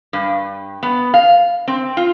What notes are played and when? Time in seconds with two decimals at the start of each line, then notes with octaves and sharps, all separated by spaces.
0.13 G2
0.83 B3
1.14 F5
1.68 C4
1.97 F4